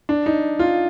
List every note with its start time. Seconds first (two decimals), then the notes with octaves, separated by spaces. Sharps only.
0.09 D4
0.26 D#4
0.59 F4